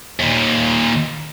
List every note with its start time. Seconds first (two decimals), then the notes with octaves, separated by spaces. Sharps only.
0.20 D#2 A#2